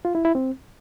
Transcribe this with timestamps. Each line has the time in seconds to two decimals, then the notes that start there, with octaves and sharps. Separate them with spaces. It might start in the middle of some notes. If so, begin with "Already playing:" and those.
0.05 F4
0.15 E4
0.25 E4
0.35 C4